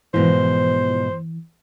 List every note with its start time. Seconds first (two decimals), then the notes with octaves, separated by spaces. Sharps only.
0.14 G#2 B2 E3 F3 C5